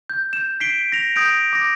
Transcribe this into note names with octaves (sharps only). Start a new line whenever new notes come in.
G6
G6 E7
B6 C7 D7 G7
A#6 F7
D#6 G6 A#6 D7
D6 A#6